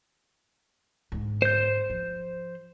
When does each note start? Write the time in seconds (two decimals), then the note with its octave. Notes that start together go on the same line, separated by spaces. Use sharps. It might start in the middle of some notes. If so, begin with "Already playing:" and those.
1.12 G#2 D3
1.42 C5 G6
1.90 F3